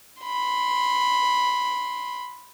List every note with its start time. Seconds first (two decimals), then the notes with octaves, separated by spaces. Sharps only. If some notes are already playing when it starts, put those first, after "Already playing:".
0.22 B5 C6